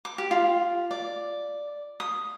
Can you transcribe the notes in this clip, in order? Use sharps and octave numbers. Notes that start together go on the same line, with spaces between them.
D6
G4
F4
D5
D#6